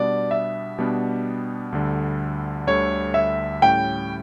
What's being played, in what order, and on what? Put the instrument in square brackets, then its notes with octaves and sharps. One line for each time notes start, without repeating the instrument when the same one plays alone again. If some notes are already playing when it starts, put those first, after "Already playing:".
Already playing: [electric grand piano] B2 G3 B3 D4 [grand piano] D5
[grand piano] E5
[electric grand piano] B2 G3 B3 D4
D2 D3 G3
[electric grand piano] D2 D3 G3 [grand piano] C#5
[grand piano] E5
[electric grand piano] A2 G3 C#4 E4 [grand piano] G5